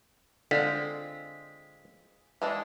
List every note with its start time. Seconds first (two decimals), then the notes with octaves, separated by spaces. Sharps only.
0.51 D3 G#3 C4 F4 B6
2.42 E3 G#3 D4